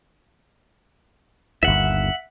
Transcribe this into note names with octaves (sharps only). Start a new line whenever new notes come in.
G1 D#2 E5 F#5